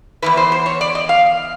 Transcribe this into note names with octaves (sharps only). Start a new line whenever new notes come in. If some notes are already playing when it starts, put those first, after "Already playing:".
E2 C#3 E3 B4
C5
C5
C#5
D5
D#5
F5